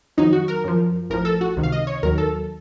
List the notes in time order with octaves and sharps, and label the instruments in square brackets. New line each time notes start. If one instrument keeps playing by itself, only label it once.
[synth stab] F2 D#3 F#3 D#4
F#4
A#4
F#2 F3
A1 A2 F3 A#4
A4
F#4
C#2 C3 D#3
F5
D#5
C#5
D#2 D#3 F#3 A#4
A4